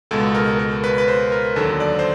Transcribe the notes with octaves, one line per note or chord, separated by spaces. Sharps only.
C#2 B2 G#3 A4
A#4
A#4
B4
B4
C5
A#4
D#2 D3 F#3 A4
D5
C5